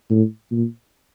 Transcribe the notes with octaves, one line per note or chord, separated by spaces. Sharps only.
A2
A#2